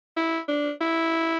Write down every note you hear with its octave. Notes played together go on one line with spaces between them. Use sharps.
E4
D4
E4